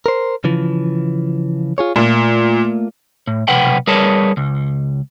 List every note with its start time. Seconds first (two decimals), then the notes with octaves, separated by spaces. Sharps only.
0.06 A#4 C5
0.44 C#3 E3 F3
1.78 F4 G#4 C#5
1.96 A#2 A3 A#3 F4
3.27 A2
3.48 B1 C3 B4 F#5 G5
3.87 G3 G#4 A#4 B4 C#5 A5
4.37 C#2